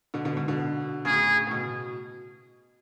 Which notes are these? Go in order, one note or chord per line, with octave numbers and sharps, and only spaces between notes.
B2 D3
B2 D3
G#2 B2
B2 D3
A2 C#3 G#4
A2
B2